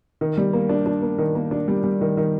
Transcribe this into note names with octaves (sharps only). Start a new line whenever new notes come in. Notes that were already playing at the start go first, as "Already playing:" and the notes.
D#3
G3
A#3
D4
D4
A#3
D#3
A#3
D4
G3
G3
D#3
D#3